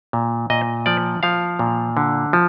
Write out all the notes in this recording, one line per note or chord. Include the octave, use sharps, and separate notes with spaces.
A#2
A#2 D#5
F3 D5
F3 F5
A#2
D3
F3